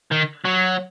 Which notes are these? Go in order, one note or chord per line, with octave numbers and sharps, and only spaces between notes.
D#3
F#3